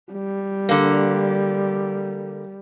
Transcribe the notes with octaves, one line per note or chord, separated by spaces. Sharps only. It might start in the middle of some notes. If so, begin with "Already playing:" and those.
G3
D3 A#3